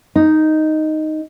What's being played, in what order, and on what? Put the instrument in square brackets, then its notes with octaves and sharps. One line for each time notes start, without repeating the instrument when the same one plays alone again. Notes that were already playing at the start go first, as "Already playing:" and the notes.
[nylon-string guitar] D#4